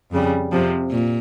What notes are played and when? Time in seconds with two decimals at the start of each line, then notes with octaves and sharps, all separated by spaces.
0.11 F2 C#3 G3
0.52 F2 C3 F3
0.91 A#2